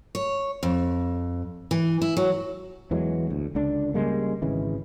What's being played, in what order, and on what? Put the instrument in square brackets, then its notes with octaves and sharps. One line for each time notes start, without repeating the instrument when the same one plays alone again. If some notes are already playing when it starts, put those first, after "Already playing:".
[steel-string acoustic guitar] C#5
F2
E3
E4
F#3
[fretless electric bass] E2 E3 F#3 G#3
D2
C#2 D3 D4
C#3 G3 G#3 A#3
G#1 C#3 E3